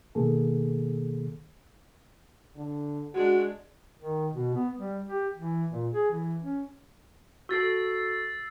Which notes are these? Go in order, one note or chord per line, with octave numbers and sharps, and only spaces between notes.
B2 D#3 A#3 G#4 A4
D3
G#3 D4 F#4
D#3
B2
B3
G3
G4
E3
A#2
G#4
E3
C#4
F#4 A4 E6 A6 C7